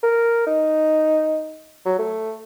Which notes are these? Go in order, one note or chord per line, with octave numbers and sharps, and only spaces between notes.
A#4
D#4
F#3
A3